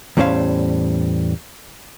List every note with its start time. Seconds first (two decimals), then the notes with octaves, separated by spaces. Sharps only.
0.17 E2 A2 G3 C#4 C5 F5